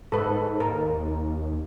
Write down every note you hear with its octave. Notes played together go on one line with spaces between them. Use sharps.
G#2 A4 B4
D#2 A#4